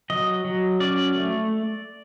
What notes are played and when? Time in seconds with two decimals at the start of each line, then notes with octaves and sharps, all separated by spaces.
0.10 F#3 D#5
0.45 F#3
0.80 C#4 D5
1.15 A3